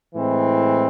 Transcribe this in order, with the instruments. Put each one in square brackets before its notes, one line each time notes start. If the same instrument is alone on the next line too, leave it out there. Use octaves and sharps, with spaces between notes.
[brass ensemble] A2 E3 G#3 C4